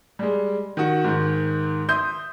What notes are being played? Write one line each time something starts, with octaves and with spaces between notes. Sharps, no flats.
G3 G#3
D#3 F#4
G#2 D#3
E5 C6 D#6 G6